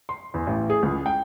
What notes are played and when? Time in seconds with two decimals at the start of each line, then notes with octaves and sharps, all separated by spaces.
0.09 C6
0.34 E2
0.47 A1
0.70 G#4
0.83 C#2
1.06 G5